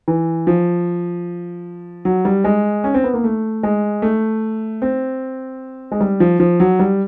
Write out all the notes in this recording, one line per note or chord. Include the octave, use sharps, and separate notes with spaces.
E3
F3
F#3
G3
G#3
C#4
C4
B3
A#3
A3
G#3
A3
C4
G#3
G3
F3
F3
F#3
G3